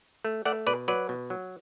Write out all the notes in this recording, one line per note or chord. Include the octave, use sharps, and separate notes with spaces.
A3
A3 D5 F#5
B2 B4 D5
F#3 B4 D5
B2
F#3